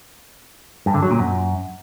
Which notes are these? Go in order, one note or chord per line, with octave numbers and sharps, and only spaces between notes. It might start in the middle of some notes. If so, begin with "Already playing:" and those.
G2
D3
F#3
A#2
F#2